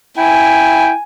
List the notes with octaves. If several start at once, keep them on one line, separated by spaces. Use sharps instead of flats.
E4 G5 G#5